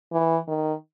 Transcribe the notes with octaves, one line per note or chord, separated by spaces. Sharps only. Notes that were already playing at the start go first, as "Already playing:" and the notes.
E3
D#3